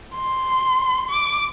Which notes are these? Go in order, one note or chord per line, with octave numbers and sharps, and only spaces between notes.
C6
D6